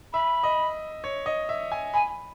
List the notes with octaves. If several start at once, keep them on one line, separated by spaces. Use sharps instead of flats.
E5 B5
D#5
C#5
D#5
E5
G#5
G#5 B5